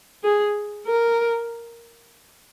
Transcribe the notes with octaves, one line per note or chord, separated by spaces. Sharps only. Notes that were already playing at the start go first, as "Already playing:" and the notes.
G#4
A#4